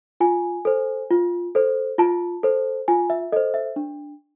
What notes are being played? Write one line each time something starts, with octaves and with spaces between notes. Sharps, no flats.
F4 G#5
A4 C5
F4
A4 C5
F4 A5
A4 C5
F4 G#5
E5
A4 C5 D#5
E5
D4